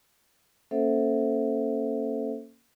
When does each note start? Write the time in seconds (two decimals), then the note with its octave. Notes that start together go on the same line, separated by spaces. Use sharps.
0.71 A#3 C#4 A4 C5 E5 F#5